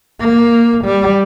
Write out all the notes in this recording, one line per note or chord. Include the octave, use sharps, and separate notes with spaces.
A#3
G3